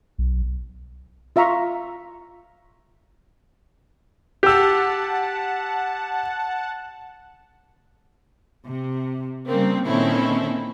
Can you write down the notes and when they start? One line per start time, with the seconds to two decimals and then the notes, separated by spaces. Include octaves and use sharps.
0.18 B1
1.36 F4 E5 F5 A#5 C#6
4.43 G4 F#5 A5 E6
8.66 C3
9.47 C#3 G3 A#3 C4
9.86 A#2 D#3 C4 C#4 E4 A4